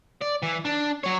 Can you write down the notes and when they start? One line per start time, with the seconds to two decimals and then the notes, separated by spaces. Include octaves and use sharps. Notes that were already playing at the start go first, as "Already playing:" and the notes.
0.21 D5
0.43 E3
0.65 D4
1.03 F#3 C#5